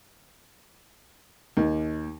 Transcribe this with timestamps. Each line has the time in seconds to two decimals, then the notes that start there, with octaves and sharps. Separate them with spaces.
1.57 D#2